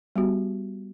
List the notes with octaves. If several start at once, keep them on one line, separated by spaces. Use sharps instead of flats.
G3 B3 F#4 G4